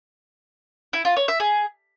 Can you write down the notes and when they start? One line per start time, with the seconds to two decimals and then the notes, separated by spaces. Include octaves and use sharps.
0.93 E4
1.05 F4
1.17 C#5
1.28 E5
1.40 G#4